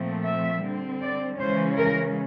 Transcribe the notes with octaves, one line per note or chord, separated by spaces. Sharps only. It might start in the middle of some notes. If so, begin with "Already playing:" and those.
Already playing: A#2 F3 A3 C4
E5
D3 G3 C4
D5
C#3 E3 G#3 C#4 C5
A#4